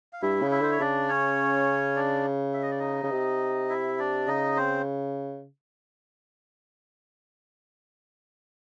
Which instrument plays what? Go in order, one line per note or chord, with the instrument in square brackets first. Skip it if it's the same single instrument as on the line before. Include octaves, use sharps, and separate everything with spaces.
[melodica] F5
[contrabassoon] G2 [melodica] E4 E5
[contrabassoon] C#3
[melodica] E4 E5
[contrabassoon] D3 [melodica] C5
[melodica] C#5
[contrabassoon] C#3 [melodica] D4 D5
[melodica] C#4 C#5
D4 D5
E5
D#5
D5
D#4 D#5
[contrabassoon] C#3
C3
[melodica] E4 E5
D4 D5
[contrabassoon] C#3 [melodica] D#4 D#5
[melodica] C4 C5